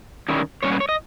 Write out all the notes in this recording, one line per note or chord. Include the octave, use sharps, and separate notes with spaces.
D#3 G3 C#4 E4
A#2 G3 C#4 C#5
B4
C#5
D#5